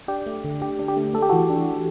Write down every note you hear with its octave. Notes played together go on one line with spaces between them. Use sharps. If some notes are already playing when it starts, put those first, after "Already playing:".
D4 G4
A3
D3
D3 G4
D4
G4
A3
A3 A4
G4
E3 F#4 A4
D4